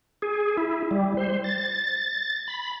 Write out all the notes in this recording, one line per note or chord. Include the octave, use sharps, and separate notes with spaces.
G#4
E4
G3
C5
A6
B5